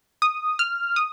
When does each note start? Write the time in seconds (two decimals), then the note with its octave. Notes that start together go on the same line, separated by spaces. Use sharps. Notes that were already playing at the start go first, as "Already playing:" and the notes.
0.22 D#6
0.59 F6
0.96 D#6